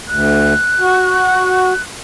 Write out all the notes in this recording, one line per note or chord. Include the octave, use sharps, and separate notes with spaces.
D2 F#6
F#4